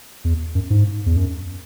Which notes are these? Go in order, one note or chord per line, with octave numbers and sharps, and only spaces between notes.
E2
F#2
G#2
E2
F#2